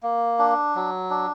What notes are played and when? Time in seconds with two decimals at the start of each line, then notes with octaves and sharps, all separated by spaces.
0.03 A#3
0.39 D4
0.75 F#3
1.10 D4